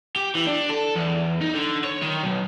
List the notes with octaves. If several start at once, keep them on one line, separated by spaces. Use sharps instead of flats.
G4
E3
D4
A4
E2
D#4
D3
C#5
D#3
B1